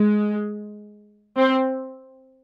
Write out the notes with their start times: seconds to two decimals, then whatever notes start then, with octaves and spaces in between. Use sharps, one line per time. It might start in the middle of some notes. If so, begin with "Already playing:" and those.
Already playing: G#3
1.37 C4